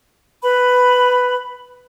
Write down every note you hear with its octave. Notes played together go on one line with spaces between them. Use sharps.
B4 B5